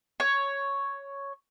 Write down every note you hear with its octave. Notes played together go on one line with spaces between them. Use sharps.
C#5